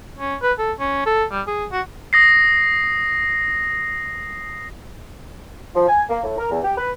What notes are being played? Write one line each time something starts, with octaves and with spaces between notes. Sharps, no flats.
C#4
B4
A4
C#4
A4
G3
G#4
F#4
D#6 A#6 C7
F3
G#5
A#3
A2
A#4
E2
G4
B4